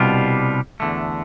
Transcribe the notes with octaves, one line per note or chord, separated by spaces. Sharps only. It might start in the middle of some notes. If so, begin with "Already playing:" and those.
Already playing: C2 B2 G3 D4 F4
E2 D3 A3